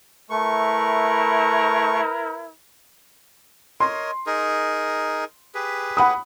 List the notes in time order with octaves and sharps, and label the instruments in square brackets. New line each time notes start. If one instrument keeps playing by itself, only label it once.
[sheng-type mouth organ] A3 C#6 [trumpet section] E4 A#4 B4
[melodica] A#4 C#5 D#5 [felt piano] C6
[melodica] D#4 G#4 A#4
G4 G#4 B4
[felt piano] F#5 B5 D#6